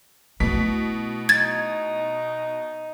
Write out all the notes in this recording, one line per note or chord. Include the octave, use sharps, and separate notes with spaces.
B2 A3 E4 B6
D#4 G#6 A6